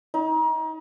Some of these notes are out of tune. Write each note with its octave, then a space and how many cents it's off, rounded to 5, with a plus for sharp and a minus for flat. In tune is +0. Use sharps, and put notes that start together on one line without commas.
D#4 +30